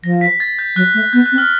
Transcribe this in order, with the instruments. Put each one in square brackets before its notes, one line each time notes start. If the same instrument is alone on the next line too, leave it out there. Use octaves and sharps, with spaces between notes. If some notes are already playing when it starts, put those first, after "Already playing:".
[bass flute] F3 [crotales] A#6
[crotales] B6
A6
G6
[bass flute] F#3 [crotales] F#6
[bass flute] A3
[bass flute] B3 [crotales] G6
[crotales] F#6
[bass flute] C4
[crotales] F6